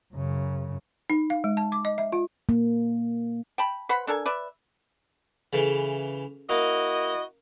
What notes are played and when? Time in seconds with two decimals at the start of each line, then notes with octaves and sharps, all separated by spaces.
0.14 F#2 C#3
1.10 D#4
1.30 F5
1.44 G#3
1.57 A5
1.72 D6
1.85 D#5
1.98 E5
2.12 F4
2.49 A#3
3.58 G5 A5 B5
3.89 B4 C5 F#5 B5
4.07 D4 A4 A#4 G#5
4.26 B4 D5 E5
5.53 C#3 E3 C#4 G#4 A4
6.49 A#3 E4 F#4 D#5